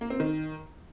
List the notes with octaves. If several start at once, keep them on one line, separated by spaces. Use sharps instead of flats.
A#3
C4
D#3